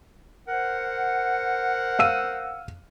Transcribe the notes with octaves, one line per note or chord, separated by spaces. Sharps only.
A#4 C5 F#5
F5 E6 D#7